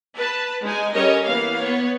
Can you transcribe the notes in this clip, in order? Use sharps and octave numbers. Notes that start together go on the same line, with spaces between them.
B4 A5
G#3 D#4 G#5
G3 C#4 A4 A#4 C#5 D#5
E3 A#3 B3 F5
B3 C#5